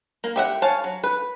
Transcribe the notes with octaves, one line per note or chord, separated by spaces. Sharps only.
A#3
G4 E5 F#5
C#5 F5 G#5 A5
F#3
B4